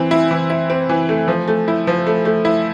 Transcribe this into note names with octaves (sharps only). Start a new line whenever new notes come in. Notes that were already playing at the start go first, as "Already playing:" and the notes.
Already playing: E3 C4
E4
E3
E4
C4
E3
A3
F3
A3
E4
F3
A3
A3
E4